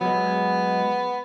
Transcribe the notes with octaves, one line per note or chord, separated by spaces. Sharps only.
F#3 G#3 B3